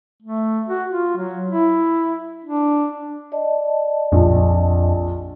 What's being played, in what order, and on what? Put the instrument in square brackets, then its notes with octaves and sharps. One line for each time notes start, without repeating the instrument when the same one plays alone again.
[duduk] A3
F#4
F4
F#3
E4
D4
[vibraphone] D5 D#5 A5
[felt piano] A#1 [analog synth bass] F2